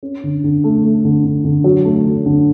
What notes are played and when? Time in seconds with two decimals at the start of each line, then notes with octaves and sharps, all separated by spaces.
0.03 C#4
0.23 D3
0.44 D3
0.64 A3
0.84 A3
1.05 D3
1.25 D3
1.44 D3
1.64 F#3
1.84 A3
2.05 F#3
2.26 D3